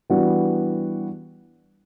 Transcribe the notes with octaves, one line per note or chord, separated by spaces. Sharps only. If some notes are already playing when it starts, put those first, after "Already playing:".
E3 G3 B3 D4 F#4